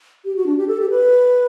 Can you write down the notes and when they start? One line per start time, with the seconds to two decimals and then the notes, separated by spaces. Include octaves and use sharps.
0.25 G4
0.36 F#4
0.46 D4
0.57 G4
0.68 A4
0.80 G4
0.90 B4